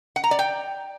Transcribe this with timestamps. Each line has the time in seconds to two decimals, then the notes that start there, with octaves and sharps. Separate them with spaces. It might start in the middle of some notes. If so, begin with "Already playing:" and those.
0.16 F#5
0.24 A#5
0.31 D5
0.39 G5